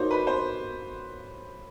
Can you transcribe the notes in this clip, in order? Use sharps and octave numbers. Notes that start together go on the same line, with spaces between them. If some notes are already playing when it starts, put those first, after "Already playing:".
Already playing: A#3 D#4 F#4 C5 C#5
B4
C5